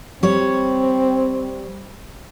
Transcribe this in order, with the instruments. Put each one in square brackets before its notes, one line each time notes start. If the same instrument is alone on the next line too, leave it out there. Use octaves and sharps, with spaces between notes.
[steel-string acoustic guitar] G3 C#5 [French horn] C4